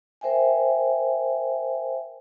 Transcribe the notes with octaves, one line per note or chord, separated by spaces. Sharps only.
A#4 C5 E5 G5 G#5